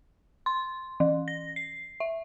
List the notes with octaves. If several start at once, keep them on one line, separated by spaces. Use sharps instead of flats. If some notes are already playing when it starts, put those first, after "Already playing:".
C6
E3
A#6
C7
E5